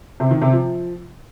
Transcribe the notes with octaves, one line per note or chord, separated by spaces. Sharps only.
C3
D#3
C3
F3